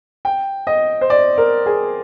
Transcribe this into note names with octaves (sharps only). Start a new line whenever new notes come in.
G5
D#5
C5
D5
A#4
G#4